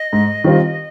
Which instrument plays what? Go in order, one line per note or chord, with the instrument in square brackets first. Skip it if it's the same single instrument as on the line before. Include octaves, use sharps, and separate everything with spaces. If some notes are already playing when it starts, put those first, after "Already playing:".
Already playing: [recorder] D#5
[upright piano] G#2
D#3 G3 C4 F4